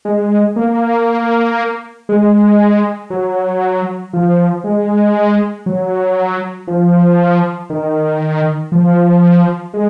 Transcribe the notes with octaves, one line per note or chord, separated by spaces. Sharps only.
G#3
A#3
G#3
F#3
F3
G#3
F#3
F3
D#3
F3
G#3